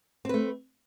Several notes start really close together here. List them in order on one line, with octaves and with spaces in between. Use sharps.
C4 B4 A3